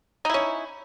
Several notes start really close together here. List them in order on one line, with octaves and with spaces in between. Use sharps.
D#4 E4 C#4